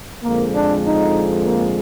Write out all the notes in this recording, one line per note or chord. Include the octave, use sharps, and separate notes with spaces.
F2 D3 F3 G#3 A#3
D4
D#4
A#3